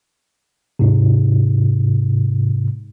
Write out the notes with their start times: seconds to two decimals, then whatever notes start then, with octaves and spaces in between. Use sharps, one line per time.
0.79 G#2 C3